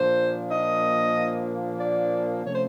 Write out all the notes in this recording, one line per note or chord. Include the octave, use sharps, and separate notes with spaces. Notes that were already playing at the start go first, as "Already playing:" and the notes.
Already playing: A#2 F3 A#3 D4 C5
D#5
D5
C3 F3 A3 C#4 C#5
C5